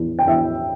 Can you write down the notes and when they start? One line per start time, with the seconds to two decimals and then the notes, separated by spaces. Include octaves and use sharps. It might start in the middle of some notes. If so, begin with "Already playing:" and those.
Already playing: E2
0.19 G5
0.27 E2 E5